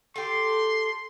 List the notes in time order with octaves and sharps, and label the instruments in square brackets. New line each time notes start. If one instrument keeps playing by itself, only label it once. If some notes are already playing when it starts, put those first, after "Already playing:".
[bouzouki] G4 A4 [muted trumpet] C6